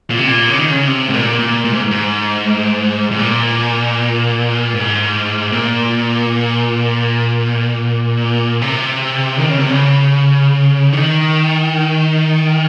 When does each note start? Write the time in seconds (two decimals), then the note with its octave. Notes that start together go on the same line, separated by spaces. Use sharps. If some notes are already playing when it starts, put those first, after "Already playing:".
0.10 A#2
0.18 C3
0.27 A#2
0.49 C#3
0.59 D#3
0.70 C#3
0.87 C3
1.08 G#2
1.13 A#2
1.39 A#2
1.65 A#2
1.73 G#2
1.91 G#2
3.11 G#2
3.19 A#2
4.74 G#2
5.52 A#2
8.62 C3
9.38 D#3
9.49 C#3
9.59 C3
9.70 C#3
10.93 D#3